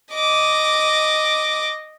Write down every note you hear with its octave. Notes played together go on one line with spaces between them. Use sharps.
D#5 D6